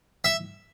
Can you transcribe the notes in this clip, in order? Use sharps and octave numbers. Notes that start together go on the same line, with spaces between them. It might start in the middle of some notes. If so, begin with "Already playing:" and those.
E5